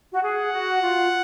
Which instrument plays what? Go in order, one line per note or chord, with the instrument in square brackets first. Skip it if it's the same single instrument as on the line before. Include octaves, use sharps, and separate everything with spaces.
[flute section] F#4
[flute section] G#4 [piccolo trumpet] F#5
[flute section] F#4
F4